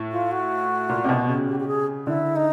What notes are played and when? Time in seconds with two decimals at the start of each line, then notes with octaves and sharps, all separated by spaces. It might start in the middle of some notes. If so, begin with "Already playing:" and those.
Already playing: A2
0.11 F4
0.31 F#4
0.89 A#2
1.04 C3
1.09 B2
1.28 C#3
1.48 G4
1.60 G4
1.67 G#4
2.07 D3 E4
2.36 D#4